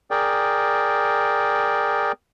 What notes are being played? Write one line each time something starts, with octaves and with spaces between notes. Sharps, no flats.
G#4 A#4 D5 G5